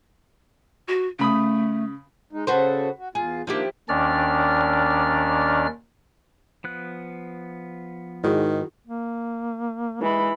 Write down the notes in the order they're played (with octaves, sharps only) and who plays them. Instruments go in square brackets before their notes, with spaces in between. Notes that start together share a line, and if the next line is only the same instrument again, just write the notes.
[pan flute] F#4
[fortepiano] C#3 B5 D#6 [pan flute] A3
[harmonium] G#3 D#4
[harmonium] C#3 A4 [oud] F#4 B4 C5
[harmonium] F#4
[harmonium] E2 F4 [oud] G#4
[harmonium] D#3 A#3 D4 [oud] F3 E4 G4
[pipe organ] D#2 D#3 C#4 D4 D5 F6
[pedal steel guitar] F3 B3 F#6
[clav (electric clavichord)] G#2 [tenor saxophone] D#3 [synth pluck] E4 F#4 G#4
[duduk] A#3
[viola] E3 B5 [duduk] G#3